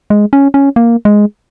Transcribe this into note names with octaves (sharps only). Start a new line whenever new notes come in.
G#3
C#4
C#4
A#3
G#3